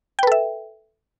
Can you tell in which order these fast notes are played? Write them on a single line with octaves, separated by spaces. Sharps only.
G5 B4 A4 E5